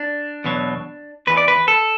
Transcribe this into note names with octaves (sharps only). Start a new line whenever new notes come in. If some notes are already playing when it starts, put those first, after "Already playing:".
Already playing: D4
E2 B2 F#3
E2 E3 B4
D5
B4
A4